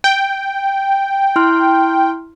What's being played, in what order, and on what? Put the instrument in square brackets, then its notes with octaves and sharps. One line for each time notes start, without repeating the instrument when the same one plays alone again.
[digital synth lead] G5
[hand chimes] E4 C6 F6